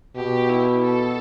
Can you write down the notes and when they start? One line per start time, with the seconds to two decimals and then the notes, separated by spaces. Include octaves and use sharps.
0.16 B2 G4
0.50 E4
0.85 A4